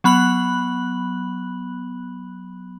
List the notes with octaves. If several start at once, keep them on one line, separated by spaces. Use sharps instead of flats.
F#3 B3 B5 F#6 F#7